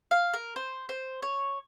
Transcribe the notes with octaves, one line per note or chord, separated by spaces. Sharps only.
F5
A#4
C5
C5
C#5